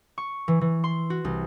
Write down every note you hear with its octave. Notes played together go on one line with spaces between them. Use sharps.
C#6
E3
E3
C6
F#4
C2